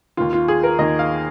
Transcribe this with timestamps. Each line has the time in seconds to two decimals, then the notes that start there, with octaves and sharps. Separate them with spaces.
0.17 D#2 D#3 F4
0.33 F4
0.48 G#4
0.63 A#4
0.79 D#2 D#3 D#5
0.99 F5